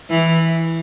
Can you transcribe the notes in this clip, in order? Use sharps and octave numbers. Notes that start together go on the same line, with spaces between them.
E3